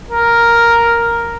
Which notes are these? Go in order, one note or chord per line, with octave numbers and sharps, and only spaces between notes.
A#4